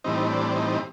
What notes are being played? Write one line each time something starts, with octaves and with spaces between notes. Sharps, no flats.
A2 E3 G3 C4 D#4
D4
D#4